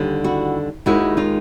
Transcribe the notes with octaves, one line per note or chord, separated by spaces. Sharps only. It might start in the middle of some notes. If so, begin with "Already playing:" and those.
Already playing: D#2 D3 G3
E4 F#4
D#2 D#3 G#3 E4 F#4
D#4 F4